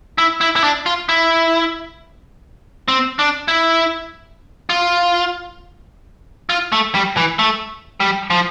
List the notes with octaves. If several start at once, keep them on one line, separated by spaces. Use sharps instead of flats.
E4
E4
E4
D4
F4
E4
C4
D4
E4
F4
F4
A3
G3
E3
A3
G3
F3